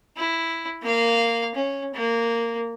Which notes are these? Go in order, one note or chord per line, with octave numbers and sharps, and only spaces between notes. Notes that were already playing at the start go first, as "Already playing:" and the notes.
E4
A#3 F5
C#4
A#3